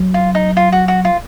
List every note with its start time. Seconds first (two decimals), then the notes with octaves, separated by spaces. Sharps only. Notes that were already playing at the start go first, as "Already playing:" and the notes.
Already playing: F#3
0.14 F4
0.35 D#4
0.57 F4
0.72 F#4
0.88 F#4
1.05 F4